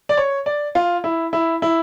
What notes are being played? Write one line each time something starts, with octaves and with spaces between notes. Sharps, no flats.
D5
C#5
D5
F4
E4
E4
E4